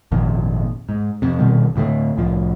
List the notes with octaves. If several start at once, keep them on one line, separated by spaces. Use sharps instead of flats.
G#1 F2 A#2 D#3
G#2
F2 C3
A#1 B2 D#3 G3
D2 A2 F3 A3
C2 A2 F3